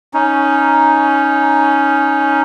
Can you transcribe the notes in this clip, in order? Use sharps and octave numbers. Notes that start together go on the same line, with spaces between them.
C#4 D#4